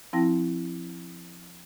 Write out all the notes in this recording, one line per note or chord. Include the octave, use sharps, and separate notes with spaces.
F3 C4 E4 G5 A5 A#6